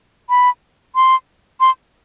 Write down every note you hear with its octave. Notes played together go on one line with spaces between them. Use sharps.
B5
C6
C6